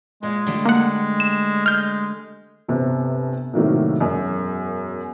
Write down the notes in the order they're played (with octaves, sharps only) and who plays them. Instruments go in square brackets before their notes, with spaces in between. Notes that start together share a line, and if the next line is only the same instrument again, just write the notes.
[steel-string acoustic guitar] A#2 [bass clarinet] G#3
[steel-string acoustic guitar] D3 G3 A3
[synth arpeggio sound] A#3 F#5
E7
[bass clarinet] G#3 [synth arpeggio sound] F6 G6
[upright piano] G1 C3
A2 C3 D#3 F#3 A3 A#3
E1 F#2